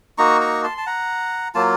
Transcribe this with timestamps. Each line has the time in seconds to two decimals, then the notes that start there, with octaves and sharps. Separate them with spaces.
0.18 A#3 D#4 F#4 A#5 C#6
0.41 A#5 C#6
0.64 A5 C6
0.78 A5
0.86 F#5 A#5
1.55 F#3 A#3 F4 A5